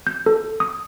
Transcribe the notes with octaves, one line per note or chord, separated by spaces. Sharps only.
G6
A4
D#6